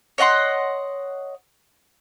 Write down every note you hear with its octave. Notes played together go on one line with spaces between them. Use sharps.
C#5 D#5 F#5 C6